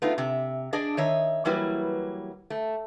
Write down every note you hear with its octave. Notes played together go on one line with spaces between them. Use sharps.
A3 B3 D4 D#4 F4
C3 E5
D4 G#4 D5 D#5
D#3 C#5 D#5 E5
E3 F#3 G3 A#3 E4 B4
A3